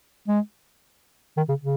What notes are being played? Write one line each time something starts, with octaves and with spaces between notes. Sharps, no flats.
G#3
D#3
C#3
C#3